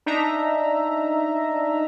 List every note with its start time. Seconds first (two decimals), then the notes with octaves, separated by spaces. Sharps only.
0.06 D4 D#4 E5 A#5